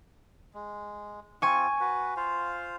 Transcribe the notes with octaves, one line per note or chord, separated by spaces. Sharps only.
G#3
C4 F4 G#5 C#6
F#4 B4
F4 C5 F5